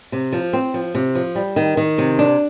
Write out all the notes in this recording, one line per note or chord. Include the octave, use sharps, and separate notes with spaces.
C3
F3
C4
F3
C3
F3
G3
D#3
D#3
C3
D4